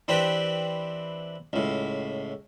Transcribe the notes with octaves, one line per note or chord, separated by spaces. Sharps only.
E3 C4 D4 G4 B4
C#2 A2